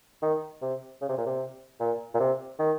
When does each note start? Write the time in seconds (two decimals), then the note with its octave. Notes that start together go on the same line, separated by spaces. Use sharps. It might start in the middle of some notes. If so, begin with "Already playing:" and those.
0.22 D#3
0.62 C3
1.02 C#3
1.09 C3
1.18 A#2
1.26 C3
1.80 A#2
2.14 A#2
2.20 C3
2.59 D#3